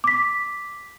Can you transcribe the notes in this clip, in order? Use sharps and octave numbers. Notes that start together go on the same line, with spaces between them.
D6 B6